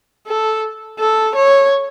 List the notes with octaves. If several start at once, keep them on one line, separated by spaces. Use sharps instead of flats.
A4
A4
C#5